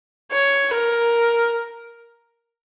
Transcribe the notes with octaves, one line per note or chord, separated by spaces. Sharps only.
C#5
A#4